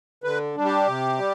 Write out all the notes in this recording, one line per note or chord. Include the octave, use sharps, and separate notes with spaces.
D3 B4
G3 D4
G4
C3
G3